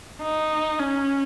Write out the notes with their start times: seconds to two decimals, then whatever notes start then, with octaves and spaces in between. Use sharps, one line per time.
0.22 D#4
0.79 C#4